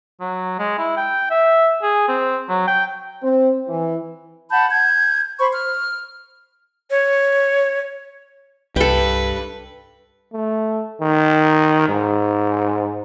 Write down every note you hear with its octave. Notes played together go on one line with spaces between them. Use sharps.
F#3
G#3
E4
G5
E5
G#4
C4
F#3
G5
C4
E3
F#5 A5 B5 G6
G6 G#6
C5 B5 C#6
F6
C#5
C2 G2 A4 B4 G5
A3
D#3
G#2